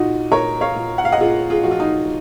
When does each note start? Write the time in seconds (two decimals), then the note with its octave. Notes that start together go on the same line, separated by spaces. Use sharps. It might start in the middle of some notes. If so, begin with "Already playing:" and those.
Already playing: A#2 D#4 F4 F#4
0.32 A#2 A#4 C#5
0.61 C#5 F5
0.76 A#2
0.98 F#5
1.05 F5
1.12 D#5 F#5
1.20 A#2 F4 G#4
1.50 F4 G#4
1.63 F3 F#4
1.71 F4
1.80 D#4